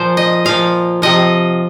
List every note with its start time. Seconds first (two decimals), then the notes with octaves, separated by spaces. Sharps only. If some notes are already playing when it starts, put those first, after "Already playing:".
Already playing: A#2 F3 C5
0.17 D#5
0.45 A#2 F3 F5
1.02 C3 F3 D#5